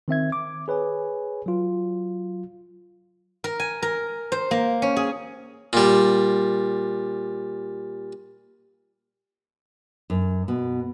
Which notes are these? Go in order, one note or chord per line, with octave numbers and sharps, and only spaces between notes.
D#3 C4 E5 G#6
D6
G#4 B4 C#5 G#5
F#3 F4
A#4
G#5
A#4
C5
A#3
C#4
G#4
A#2 G3
F#2
B2